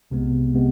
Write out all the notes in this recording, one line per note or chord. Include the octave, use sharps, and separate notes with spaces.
C2 C3 G#3 B3
C3 G#3 B3